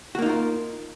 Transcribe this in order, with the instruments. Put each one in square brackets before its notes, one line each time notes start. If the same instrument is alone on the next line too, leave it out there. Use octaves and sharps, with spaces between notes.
[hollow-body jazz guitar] F#4
A#3
D#4
F4
A#4